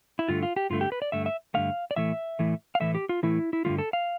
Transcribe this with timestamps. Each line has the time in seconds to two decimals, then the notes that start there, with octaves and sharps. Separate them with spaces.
0.19 E4
0.29 G2 D3 A3 F4
0.43 F4
0.56 G4
0.70 G2 D3 A3 F4
0.81 G4
0.92 B4
1.02 D5
1.12 G2 D3 A3 E5
1.26 E5
1.54 G2 D3 A3 F5
1.91 D5
1.96 A2 E3 A3 E5
2.39 A2 E3 A3
2.75 F5
2.80 A2 E3 A3 E5
2.95 G4
3.09 F4
3.23 A2 E3 A3 E4
3.53 E4
3.65 G2 D3 F3 A3 F4
3.78 A4
3.93 F5